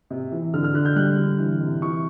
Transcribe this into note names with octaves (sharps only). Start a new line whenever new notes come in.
C3
E3
D3 F6
F6
D3 F#6
G6
G3 F#6
D3
E3
C3
E3 C#6